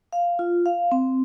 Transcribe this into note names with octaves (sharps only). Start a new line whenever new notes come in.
F5
F4
F5
C4